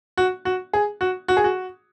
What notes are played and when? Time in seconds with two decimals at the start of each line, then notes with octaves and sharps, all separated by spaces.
0.17 F#4
0.45 F#4
0.73 G#4
1.01 F#4
1.28 F#4
1.37 G#4
1.44 F#4